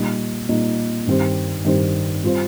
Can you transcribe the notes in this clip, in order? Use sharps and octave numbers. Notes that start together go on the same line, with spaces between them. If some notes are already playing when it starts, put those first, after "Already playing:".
Already playing: A#2 G3 D#4
A#2 G3 D#4
G2 D#3 C4 G4 C5
G2 D#3 C4 G4 C5
G3 C4 F4 C5